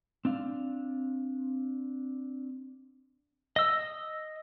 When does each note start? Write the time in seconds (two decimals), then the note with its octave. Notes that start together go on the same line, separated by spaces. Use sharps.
0.25 C4 D4 F5
3.56 D#5 E6